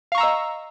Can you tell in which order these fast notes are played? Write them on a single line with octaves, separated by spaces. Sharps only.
F5 C#6 A#5 E6 D#5